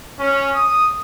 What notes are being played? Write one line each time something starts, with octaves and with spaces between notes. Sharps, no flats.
C#4
D#6